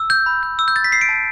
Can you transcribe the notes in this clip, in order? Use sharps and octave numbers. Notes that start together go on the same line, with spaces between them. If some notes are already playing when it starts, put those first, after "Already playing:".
Already playing: E6
G6
B5
G6
E6
G6
E6 A6
B6
E6 C7
D7
A5